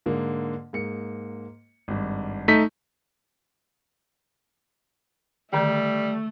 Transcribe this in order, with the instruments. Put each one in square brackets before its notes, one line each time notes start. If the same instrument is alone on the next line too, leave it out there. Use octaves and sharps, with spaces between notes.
[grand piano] G#2 D3 A#3
G#2 A#3 C#7
G#1 G2
[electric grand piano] A3 D#4 B6
[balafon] D3 D#3 D5 [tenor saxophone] G3 [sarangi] A3